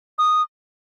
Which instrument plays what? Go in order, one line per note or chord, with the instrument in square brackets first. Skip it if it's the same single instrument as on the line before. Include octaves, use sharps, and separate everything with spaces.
[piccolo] D#6